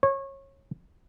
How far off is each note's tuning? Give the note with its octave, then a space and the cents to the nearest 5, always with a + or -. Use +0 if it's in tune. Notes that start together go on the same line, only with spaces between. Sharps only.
C#5 -25